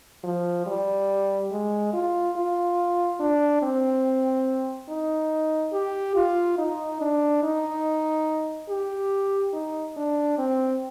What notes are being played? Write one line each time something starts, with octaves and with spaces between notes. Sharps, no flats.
F3
G3
G#3
F4
F4
D4
C4
D#4
G4
F4
D#4
D4
D#4
G4
D#4
D4
C4